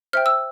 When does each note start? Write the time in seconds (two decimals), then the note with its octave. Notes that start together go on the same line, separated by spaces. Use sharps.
0.13 C5 E5 G5 F6
0.26 E6